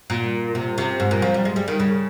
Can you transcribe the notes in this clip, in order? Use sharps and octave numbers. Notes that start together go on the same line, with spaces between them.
A#2
C3
C3
G#2
A#2
F3
G3
G#3
G3
D#3
C#3